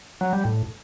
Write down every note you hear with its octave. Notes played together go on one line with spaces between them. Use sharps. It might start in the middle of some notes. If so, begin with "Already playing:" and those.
F#3
G3
A2